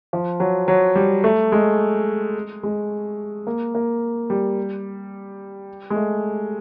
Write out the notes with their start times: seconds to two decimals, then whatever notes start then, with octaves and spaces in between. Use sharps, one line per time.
0.13 F3
0.40 F#3
0.68 F#3
0.95 G3
1.24 A3
1.52 G#3
2.63 G#3
3.47 A#3
3.75 A#3
4.30 G3
5.90 G#3
5.96 A3